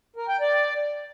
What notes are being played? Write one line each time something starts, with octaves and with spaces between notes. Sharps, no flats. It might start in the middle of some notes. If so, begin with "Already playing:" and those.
A#4
G5
D5